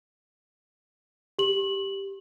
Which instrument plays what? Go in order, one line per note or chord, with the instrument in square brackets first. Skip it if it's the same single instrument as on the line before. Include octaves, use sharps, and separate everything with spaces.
[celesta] G4 F#7